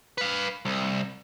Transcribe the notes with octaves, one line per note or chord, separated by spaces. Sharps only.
B4 F5
C2